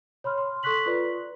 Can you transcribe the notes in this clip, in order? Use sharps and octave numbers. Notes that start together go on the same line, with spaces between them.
C#5 B5 C6 F6
C6
A4 C6 C#6 F#6 B6 F#7
F4 B4 D5